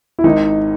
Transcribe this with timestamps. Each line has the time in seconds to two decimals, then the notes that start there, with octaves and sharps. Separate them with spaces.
0.19 E4
0.24 G#1 G#2 D#3 D#4